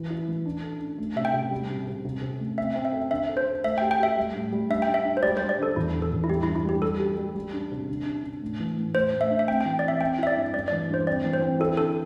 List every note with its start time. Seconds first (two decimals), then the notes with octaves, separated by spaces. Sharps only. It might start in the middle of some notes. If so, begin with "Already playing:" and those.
Already playing: E3
0.10 E4
0.28 E3
0.46 D4
0.63 A4
0.81 D4
0.98 A3
1.16 C3 E5
1.25 G5
1.34 C3
1.51 G3
1.69 C3
1.87 C3
2.05 C3
2.22 C3
2.39 A3
2.57 C4 E5
2.76 C4
2.85 E5
2.93 A4
3.11 D3 E5
3.29 A4
3.37 C5
3.46 A4
3.64 A3 E5
3.78 G5
3.81 G4
3.91 G5
3.99 G4 E5
4.18 G3
4.35 A2
4.52 G3
4.69 D4 E5
4.82 G5
4.88 D4
4.94 E5
5.05 D4
5.17 C5
5.23 G3 D5
5.37 C5
5.41 G3
5.49 D5
5.59 D3 A4
5.76 E2 E4
5.94 D3
6.02 A4
6.12 E2
6.24 E4
6.29 G3 G4
6.43 E4
6.47 G2
6.56 E4
6.65 G3 G4
6.82 G3 A4
7.00 G4
7.17 G3
7.35 G3
7.53 D4
7.71 C3
7.89 D3
8.06 D4
8.24 D4
8.42 A2
8.60 E3
8.77 A2
8.95 A2 C5
9.13 A2
9.21 E5
9.31 D4
9.39 E5
9.48 C4 G5
9.61 G5
9.65 E3
9.79 D5
9.83 C4
9.88 E5
10.01 C4 G5
10.18 E4 E5
10.27 D5
10.36 G2
10.54 G2 D5
10.68 D5
10.72 E3
10.89 G2 C5
11.07 C4 D5
11.25 E3
11.33 C5
11.42 C4
11.60 E4 A4
11.77 D3 A4